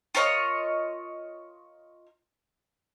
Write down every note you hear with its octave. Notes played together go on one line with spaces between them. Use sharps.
F4 A#4 C#5 D#5